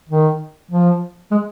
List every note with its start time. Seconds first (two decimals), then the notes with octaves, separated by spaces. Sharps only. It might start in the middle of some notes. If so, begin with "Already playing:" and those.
0.09 D#3
0.71 F3
1.31 G#3